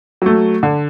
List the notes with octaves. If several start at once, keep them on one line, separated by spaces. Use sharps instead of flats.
F#3 A3
D3